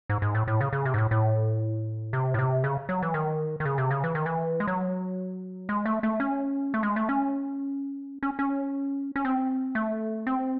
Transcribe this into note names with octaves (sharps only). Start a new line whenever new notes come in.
G#2
G#2
A2
A2
C#3
C#3
C3
G#2
A2
A2
C3
A2
C3
C#3
F#3
E3
D#3
D#3
C#3
C3
C#3
E3
D#3
E3
G#3
F#3
G#3
A3
A3
C#4
A3
G#3
A3
C#4
C#4
C#4
C#4
C4
A3
C4